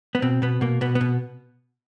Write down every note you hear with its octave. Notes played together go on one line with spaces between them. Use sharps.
B3
B2 C4
B2 B3
B2 A#3
B2 B3
B3
B2